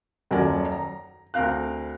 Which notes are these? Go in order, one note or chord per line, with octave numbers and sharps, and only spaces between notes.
D#1 F#2 F#3 A#4 D5 G#5
A#5
D2 C4 A#4 F5 F#6